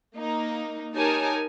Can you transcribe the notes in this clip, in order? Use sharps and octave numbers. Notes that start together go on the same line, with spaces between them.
A#3 D#4
D#4 G4 A#4 C#5 G#5 A5